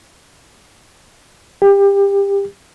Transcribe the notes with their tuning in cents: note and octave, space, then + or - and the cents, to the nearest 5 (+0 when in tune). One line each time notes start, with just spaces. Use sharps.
G4 +25